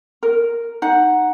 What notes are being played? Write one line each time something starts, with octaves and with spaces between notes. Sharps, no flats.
A#4
D#4 F#5